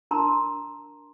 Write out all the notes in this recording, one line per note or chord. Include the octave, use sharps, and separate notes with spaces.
D4 A#4 A5 A#5 C6